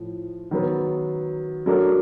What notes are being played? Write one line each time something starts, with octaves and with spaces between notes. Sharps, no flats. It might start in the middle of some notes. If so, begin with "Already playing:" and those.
Already playing: A2 F3
D#3 F#3 B3
F#3 A3 D4 F#4 A#4